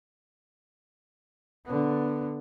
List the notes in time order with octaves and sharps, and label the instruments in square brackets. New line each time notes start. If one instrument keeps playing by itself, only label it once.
[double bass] D3 B3